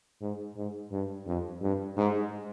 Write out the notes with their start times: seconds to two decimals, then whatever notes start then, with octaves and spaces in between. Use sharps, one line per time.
0.22 G#2
0.57 G#2
0.92 G2
1.27 F2
1.62 G2
1.97 G#2